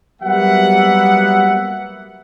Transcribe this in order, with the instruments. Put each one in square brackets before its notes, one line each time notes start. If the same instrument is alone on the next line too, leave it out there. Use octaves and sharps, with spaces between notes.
[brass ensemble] F#3 G3 A#3 B3 E5 F#5